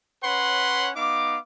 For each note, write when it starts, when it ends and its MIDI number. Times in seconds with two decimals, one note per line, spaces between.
0.23 0.91 61
0.23 0.91 71
0.23 0.91 73
0.23 0.91 78
0.23 0.91 83
0.23 0.91 84
0.96 1.38 59
0.96 1.38 63
0.96 1.38 77
0.96 1.38 86